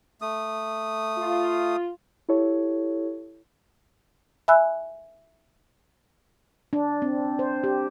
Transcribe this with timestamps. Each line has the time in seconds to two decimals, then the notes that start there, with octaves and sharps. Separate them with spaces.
0.21 A3 D#6
1.18 F4
2.29 E4 G4 A4 C#5
4.48 E5 G#5 B5 E6 F#6
6.73 D4
7.02 C4
7.39 C5
7.64 G4